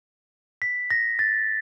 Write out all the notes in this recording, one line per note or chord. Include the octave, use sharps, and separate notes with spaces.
B6
A#6
A6